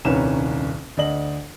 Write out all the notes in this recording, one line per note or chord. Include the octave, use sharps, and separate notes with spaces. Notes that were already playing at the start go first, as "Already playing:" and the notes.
D#1 C2 D#3 C#4 B4 E7
D2 D5 D#5 F#7